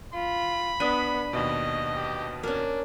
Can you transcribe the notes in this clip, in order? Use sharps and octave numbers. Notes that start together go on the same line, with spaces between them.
F4 B5
B3 D4 D#6 B6 D#7
D#2 B2 D#5
G4
A#3 C#4 D4